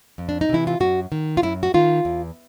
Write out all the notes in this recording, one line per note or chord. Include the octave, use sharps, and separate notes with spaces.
F2
D4
D#4
C3 E3 E4
F4
F#2 F#4
D#3
F4
F#2 E4
F#4
D#3 F4
E2